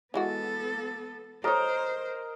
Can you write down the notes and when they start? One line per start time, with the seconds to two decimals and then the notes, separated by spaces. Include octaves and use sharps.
0.14 E3 G#3 B3 F#4 A4
1.44 A4 A#4 C5 C#5 D#5